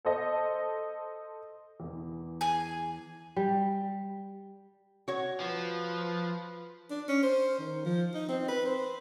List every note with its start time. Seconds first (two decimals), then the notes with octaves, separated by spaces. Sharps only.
0.05 A4 C5 D#5
1.80 E2 E3
2.41 G#4 G#5
3.36 G3
5.08 F#4 C#5
5.40 F3 B4
6.91 D4
7.09 C#4
7.23 C5
7.59 D#3
7.85 F3
8.14 D#4
8.28 C4
8.49 B4
8.66 C5